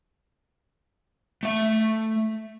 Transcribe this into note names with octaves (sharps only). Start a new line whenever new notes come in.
A3 E5